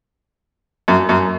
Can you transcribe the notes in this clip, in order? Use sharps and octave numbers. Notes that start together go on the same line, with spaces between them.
F#2
F#2